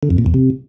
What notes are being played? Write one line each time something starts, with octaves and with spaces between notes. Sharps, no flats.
D3
F2
A#2
E2
C3